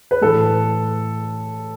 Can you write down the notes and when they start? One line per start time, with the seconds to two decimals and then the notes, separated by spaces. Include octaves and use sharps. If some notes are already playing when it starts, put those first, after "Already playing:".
0.11 B4
0.21 A2 E3 A4